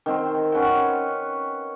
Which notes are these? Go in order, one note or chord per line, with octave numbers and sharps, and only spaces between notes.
D#3 C4 A#4
C#4 B4 F#5 G5